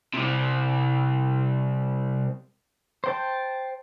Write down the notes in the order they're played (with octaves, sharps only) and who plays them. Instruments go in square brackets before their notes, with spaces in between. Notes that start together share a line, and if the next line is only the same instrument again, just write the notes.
[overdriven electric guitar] C3 G3
[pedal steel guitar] C5 G5 A5